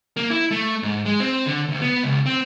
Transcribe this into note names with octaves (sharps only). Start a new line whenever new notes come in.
A#3
E4
A3
G#2
G#3
C4
D3
D2
B3
C#2
C4